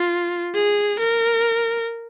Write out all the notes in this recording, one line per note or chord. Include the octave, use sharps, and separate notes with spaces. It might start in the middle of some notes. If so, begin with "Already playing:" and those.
Already playing: F4
G#4
A#4